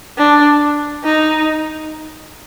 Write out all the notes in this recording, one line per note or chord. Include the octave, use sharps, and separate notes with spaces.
D4
D#4